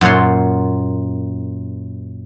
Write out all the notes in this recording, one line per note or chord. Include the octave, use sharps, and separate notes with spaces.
F#2 A#2 C#5 F#5 C6